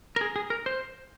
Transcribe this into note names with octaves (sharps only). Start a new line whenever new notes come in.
A#4
G#4
G#4
A#4
C5